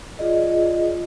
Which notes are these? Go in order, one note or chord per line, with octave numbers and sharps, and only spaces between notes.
F4 G#4 D5 D#5